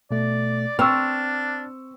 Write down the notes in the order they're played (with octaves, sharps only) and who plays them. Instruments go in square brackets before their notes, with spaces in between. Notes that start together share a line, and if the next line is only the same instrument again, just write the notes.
[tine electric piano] B2 A3 [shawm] D5
[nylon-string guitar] C4 [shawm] D4 [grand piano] C#6 E6 [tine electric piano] F6